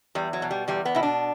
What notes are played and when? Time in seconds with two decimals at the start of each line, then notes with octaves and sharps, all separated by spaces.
0.15 E2 G3
0.33 F#3
0.42 B2
0.51 G3
0.68 E2 G3
0.85 B3
0.95 B2 E4
1.03 D4